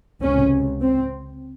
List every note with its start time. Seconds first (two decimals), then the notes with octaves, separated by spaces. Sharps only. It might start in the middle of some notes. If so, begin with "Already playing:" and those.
0.22 C#2 C3 C#4
0.81 C4